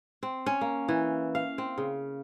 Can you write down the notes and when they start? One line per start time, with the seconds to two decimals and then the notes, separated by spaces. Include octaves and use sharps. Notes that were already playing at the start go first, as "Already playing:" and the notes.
0.23 C4
0.46 C#4
0.61 A#3
0.89 E3
1.35 F5
1.58 C4
1.78 C#3